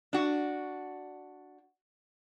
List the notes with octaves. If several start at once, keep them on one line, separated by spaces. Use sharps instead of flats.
D4 F#4